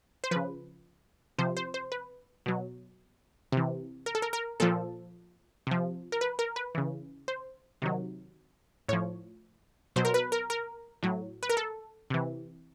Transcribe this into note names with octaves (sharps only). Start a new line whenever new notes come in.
C5
C#3 F3 B4
C3 F3 C5
C5
C5
B4
B2 F#3
C3 E3
A#4
A4
A#4
A#4
A#2 F3 A4
C3 F3
A#4
B4
A#4
B4
C#3 E3
C5
C3 D#3 F#3
A2 F3 C#5
B2 F#3 C5
A#4
B4
A#4
A#4
A2 F#3
B4
A#4
A4
C3 E3